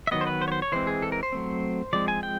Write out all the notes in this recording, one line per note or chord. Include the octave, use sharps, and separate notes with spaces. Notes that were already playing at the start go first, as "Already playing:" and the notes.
E5
D#3 F#3 B3 D#5
C5
B4
C5
C#5
C5
C#5
E3 G#3 C4 C5
G#4
A4
A#4
C5
F#3 A3 C4
F3 G#3 C4 D5
G#5
G5